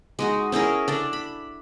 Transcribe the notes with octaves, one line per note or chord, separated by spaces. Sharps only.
G#3 D#4 F#4
C#4 E4 G#4 A#4
D4 A4 D5
B5